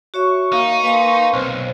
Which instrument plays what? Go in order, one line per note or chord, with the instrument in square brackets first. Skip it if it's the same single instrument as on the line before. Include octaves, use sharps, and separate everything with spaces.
[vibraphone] F#4 C#5 E5 [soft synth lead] C#6
[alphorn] A#3 [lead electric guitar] D#4
[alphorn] A#3 [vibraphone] B4 G#5 C6
[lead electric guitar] B1 [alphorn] C4